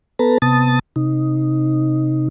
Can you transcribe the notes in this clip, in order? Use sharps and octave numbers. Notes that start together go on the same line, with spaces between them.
B3 A4 B4 A5 A#5
C3 B3 A5 D#6 A6
C3 D#4